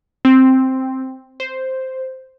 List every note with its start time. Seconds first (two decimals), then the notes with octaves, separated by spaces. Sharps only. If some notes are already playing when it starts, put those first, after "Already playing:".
0.25 C4
1.40 C5